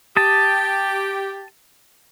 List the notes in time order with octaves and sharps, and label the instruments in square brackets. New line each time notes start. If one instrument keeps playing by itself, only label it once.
[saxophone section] G4 [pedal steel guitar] A5 D#6